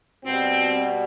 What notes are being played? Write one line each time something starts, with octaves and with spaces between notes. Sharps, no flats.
B2 G3 C4